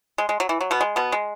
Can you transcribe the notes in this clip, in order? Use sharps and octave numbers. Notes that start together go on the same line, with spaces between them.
G#3
G#3
F#3
E3
F#3
B2 B3
G#3
B2 B3
G#3